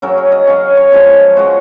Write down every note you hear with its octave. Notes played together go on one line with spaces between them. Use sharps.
C#3 F#3 C#4 A#4
A#4
D#5
C#3 F#3 C#4 F5
C#5
C#3 F3 G#3
C#3 F3 G#3 F#4